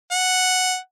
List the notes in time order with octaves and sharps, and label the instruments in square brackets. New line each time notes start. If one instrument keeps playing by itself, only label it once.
[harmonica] F#5